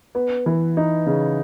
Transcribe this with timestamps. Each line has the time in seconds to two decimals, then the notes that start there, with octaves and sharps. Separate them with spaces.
0.15 B3
0.46 E3
0.77 D#4
1.06 C#3